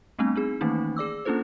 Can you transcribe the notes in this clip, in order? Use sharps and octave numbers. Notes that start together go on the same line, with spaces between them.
G3 A3 B3 C4 D4
C4 D#4 G#4
D#3 E3 A3 A#3 C#4 D#4
G#4 D5 D6 E6
A#3 C#4 D4 F4 A4 C5